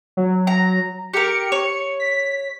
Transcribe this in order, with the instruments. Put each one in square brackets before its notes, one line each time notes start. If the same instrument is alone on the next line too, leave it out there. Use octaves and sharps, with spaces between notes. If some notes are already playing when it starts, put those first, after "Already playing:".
[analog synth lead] F#3
[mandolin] A#5
[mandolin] G4 A#4 [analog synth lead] C#7
[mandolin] C#5
[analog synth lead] B6